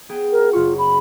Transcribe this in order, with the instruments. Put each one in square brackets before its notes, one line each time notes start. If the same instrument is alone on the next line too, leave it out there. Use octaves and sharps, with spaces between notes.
[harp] B3 G#4 G5
[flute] A#4
[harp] F#1 C#6 [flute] F4
[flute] B5